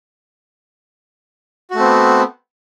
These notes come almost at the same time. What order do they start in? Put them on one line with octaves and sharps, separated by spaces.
F#4 A3 C4 B3